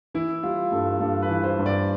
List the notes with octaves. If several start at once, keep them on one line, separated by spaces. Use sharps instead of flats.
E3 E4
G3 F4
G2 A4
G2 A4
B4
E3
C5
G2
D5